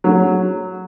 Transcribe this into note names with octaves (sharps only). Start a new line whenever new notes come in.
F#3